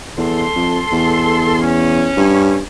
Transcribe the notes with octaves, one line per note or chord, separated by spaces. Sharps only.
E2 A4 C6
F2
E2
C#4
G2